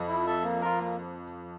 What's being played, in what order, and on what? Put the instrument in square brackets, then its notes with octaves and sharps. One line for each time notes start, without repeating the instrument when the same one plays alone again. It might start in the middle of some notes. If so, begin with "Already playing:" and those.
Already playing: [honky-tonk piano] F2 F3
[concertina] E4
A4 E5
A#3
F4 A#4
A#3